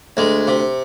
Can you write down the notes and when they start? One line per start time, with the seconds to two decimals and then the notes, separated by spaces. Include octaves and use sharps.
0.17 D2 G#3
0.47 C3